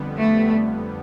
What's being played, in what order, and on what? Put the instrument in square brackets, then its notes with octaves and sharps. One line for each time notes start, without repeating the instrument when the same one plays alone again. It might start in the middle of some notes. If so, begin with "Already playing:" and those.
Already playing: [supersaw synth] F2 D3 G3 B3
[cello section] A3